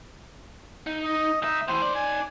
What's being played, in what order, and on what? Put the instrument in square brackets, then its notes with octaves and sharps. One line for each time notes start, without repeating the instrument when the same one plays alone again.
[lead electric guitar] D#4
[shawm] D#5
[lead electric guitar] D2 E5 [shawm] D#4
[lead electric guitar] A2 E3 [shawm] C5
[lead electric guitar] D#4 D5
[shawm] G#5